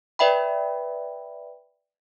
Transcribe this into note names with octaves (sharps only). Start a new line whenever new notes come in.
B4 D5 E5 G5 B5